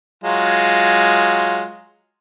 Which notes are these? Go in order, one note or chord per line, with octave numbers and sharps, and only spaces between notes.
F#3 G#3 F4